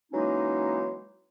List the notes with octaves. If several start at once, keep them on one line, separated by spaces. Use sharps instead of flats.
E3 F#3 G#3 A#3 C#4 D#4